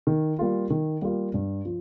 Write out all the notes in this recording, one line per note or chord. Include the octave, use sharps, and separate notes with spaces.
D#3
G3 A#3 F4
D#3
G3 A#3 F4
G2
F3